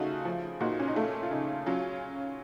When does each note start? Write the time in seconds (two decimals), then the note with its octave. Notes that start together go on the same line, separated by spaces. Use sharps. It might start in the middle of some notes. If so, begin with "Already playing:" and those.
Already playing: C#3 A3 D#4 F4 F#4
0.25 F3
0.60 A#2 D#4 F#4
0.80 C#4
0.88 D#4
0.95 A3 C#4 F4
1.23 F4
1.31 C#3 D#4
1.66 F#3 C#4 F4